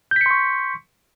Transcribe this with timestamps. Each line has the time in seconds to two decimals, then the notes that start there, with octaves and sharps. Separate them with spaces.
0.11 G6
0.16 B6
0.21 C#7
0.26 C6
0.31 C#6